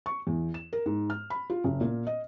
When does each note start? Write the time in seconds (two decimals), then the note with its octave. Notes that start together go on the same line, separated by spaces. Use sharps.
0.06 C#6
0.27 E2
0.54 E7
0.73 A#4
0.86 G#2
1.10 F6
1.30 B5
1.50 F4
1.64 F#1
1.81 A#2
2.07 D#5